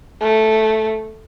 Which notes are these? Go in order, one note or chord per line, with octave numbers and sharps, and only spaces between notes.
A3